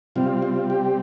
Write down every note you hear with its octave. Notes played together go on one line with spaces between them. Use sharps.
C3 G3 C4 F4
F4
G4